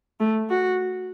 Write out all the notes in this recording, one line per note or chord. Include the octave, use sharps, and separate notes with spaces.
A3
F#4